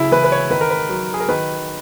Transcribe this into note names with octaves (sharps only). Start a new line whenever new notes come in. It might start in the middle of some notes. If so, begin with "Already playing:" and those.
Already playing: C#3 F#3 E4
E3 B4
B4
C#5
D#3 B4
A#4
B4
F#3
G#4
A#4
D#3 B4